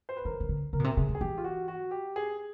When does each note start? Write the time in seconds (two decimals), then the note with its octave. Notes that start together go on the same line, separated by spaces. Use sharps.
0.09 C5
0.17 B4
0.25 D#3 A#4
0.40 D#3
0.49 D3
0.73 C#3 A#4
0.79 B2
0.84 C3
0.97 C3 G#4
1.09 C3
1.15 G#4
1.21 E3 G4
1.38 F4
1.44 F#4
1.68 F#4
1.91 G4
2.16 G#4